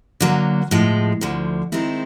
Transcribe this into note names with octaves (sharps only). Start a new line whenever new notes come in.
D3 F#3 A#3
A2 F3 G#3
D2 D3 F3
D#3 G#3 C4 E4